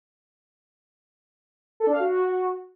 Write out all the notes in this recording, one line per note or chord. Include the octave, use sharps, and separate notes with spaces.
A4
D4
F5
F#4